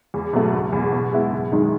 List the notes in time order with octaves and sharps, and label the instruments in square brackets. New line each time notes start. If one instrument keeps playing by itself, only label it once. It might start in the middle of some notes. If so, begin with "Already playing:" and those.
[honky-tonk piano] E2
B2 F#3 A3
F#1
E2 B2
B2
G#3 B3 E4
F#1
F#2 D#3 G#3 D#4